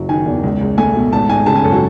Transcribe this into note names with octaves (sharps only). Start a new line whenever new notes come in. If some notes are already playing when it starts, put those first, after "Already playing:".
Already playing: F#1 F#3
D#3 G#5
E2
C#2
C#2
A3 G#5
B2
G#1 A5
G#1 G#5
C#3 A5
G#5
F#2 A4
F#4